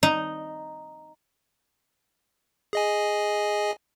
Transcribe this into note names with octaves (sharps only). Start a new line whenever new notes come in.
D#4
G#4 D#5 G#5